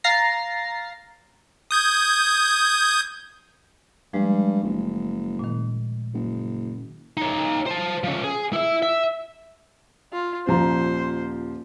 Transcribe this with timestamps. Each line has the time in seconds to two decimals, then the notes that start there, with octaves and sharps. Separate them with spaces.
0.04 F5 A#5 A6 A#6 C7
1.71 D#6 G6 G#6
4.13 G2 F3 G#3 A3
4.63 F#1
5.39 A#2 D#3
6.14 F#1
7.17 D#4 C#5
7.66 C5 A5
8.04 F3 C#4
8.24 G#4
8.53 E4 E5
8.83 E5
10.13 F4
10.47 D#1 F3 C5 A#5